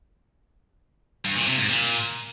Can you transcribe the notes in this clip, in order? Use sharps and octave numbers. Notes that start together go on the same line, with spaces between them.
G2
A#2
C3
G#2
A#2